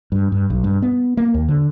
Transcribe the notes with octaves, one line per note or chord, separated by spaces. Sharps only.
G2
G2
B1
G2
B3
A#3
D#2
D3